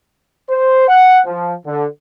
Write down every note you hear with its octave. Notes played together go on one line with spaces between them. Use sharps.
C5
F#5
F3
D3